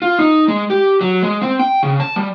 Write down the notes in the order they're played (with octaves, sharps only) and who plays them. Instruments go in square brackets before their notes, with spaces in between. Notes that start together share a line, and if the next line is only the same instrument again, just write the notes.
[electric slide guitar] F4
D#4
G#3
G4
F#3
G#3
C4
G5
C#3
A5
G3